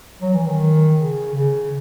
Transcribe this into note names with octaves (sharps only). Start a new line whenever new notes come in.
F#3
E3
D#3
C#3
C#3